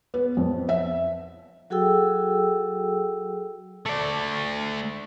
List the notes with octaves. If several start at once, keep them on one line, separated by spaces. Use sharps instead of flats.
B3
F2
E5
F#3 F#4 G#4 A4 G5 E6
A3 D5